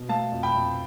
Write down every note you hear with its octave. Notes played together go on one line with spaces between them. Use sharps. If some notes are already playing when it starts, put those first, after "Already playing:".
Already playing: B2
A3 F5 A5
F2
G5 B5
F2